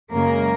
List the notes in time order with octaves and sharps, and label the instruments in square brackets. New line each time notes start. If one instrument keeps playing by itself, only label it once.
[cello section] F#2 C#3 G#3 A#3 A#4